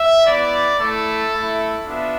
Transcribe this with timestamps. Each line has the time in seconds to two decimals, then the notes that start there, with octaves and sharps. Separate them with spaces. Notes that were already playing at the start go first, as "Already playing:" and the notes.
Already playing: E5
0.25 B3 E4 D5
0.79 A3 E4 A4
1.32 A3 E4
1.85 B3 D4 F4 E5